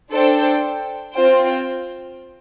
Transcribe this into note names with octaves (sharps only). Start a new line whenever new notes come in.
D4 A4 C5 G5
C4 F4 C5 G5